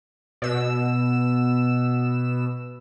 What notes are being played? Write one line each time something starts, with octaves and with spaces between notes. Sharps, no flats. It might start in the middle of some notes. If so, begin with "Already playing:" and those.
B2 E6